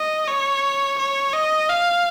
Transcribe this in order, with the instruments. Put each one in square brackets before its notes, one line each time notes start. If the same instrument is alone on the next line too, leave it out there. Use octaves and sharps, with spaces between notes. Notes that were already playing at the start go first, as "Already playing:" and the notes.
Already playing: [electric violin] D#5
C#5
C#5
D#5
F5